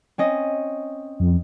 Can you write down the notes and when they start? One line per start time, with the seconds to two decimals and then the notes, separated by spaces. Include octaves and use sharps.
0.18 C4 C#4 D#5
1.20 F2